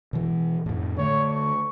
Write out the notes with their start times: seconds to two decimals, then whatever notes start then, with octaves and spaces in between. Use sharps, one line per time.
0.13 B2 E3
0.66 F2 A2
0.98 D3 A3 C#5
1.31 C#6